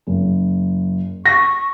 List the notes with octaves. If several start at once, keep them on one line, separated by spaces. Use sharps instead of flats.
F#1
C#6 A#6